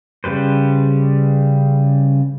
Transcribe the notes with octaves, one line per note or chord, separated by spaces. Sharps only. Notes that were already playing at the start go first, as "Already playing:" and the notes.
C#3 G3 B4 C5